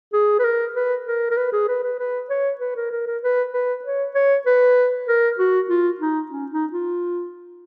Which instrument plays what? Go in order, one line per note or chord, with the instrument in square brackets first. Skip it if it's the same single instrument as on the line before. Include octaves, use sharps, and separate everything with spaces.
[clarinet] G#4
B4
A#4
B4
A#4
A#4
B4
G#4
B4
B4
B4
C#5
B4
A#4
A#4
A#4
B4
B4
C#5
C#5
B4
A#4
F#4
F4
D#4
C#4
D#4
F4